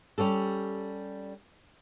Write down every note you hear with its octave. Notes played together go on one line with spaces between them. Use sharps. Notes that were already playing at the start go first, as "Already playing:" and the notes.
G3 C#4 G4 A4